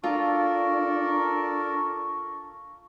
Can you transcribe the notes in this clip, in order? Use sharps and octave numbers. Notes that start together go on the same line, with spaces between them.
D4 F4 A4 A#4 D5 C#6